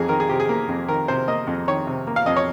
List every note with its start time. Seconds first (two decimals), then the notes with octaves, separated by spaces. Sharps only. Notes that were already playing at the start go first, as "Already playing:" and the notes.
Already playing: F2 A#3 G#4
0.09 D#3 A#4
0.20 G#4
0.29 C3 G4
0.40 G#4
0.49 A#3
0.69 F2
0.88 D#3 A#4
1.08 C3 C5
1.28 A#3 D#5
1.47 F2
1.68 D#3 C#5
1.87 C3
2.07 A#3
2.16 F5
2.26 F2 D#5
2.37 C#5